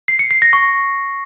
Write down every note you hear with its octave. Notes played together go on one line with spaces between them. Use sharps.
C7
C#7
C7
A#6
C#6